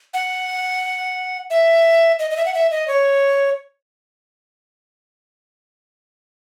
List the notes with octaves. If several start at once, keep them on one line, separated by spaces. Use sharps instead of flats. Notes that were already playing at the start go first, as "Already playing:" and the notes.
F#5
E5
D#5
D#5
E5
F#5
E5
D#5
C#5